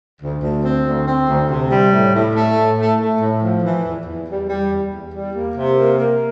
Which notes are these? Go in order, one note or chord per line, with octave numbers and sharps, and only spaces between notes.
D2
D2
C4
D2
C4
D2
C3
G3
A2
A2
A3
A2
A3
A3
A2
F3
E3
E2
E2
G3
G3
E2
E2
G3
A#3
C3
A#3
A#3